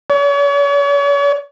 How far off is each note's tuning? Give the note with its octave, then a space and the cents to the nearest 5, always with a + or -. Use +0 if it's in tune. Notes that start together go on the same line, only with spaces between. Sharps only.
C#5 +40